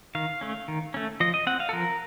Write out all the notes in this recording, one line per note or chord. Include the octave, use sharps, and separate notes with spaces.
D#3 F5
A3 C#4
D#3
A3 C#4
F3 D#5
D#5
C4 F#5
F5
A4
F3 A#4